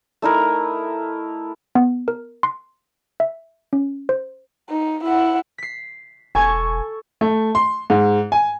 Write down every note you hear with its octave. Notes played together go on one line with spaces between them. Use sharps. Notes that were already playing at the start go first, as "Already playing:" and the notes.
A3 D#4 E4 A#4
B3
A#4
C6
E5
C#4
C5
D#4
E4 F#5
B6 C7
E1 A4 G#5 C#6 G#6
A3
C6
G#2
G#5